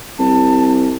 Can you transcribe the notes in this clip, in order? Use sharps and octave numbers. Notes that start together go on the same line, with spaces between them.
C2 A5